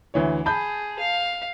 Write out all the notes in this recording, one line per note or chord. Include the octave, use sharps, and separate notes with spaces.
D2 E3 C#5
G#4 A5 B5 G6
F5